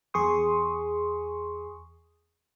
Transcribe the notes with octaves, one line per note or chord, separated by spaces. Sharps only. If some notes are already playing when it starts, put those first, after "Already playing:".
E2 G#4 C6 C#6 D#6